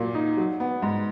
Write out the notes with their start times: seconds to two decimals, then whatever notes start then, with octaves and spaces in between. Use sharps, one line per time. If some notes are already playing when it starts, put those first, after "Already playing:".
Already playing: A#2 F#3 A#3
0.15 D#4
0.37 F#3
0.60 B3
0.82 G#2